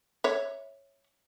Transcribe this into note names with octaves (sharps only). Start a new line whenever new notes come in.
C#5 E5